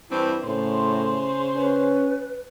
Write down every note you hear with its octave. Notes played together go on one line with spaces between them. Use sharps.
G2 E3 C4 E4
A2 C#3 C5 C6
C#4 B4